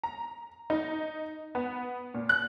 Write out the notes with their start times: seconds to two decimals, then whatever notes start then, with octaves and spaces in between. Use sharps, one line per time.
0.03 A#5
0.70 D#4
1.55 B3
2.14 A#2
2.29 F#6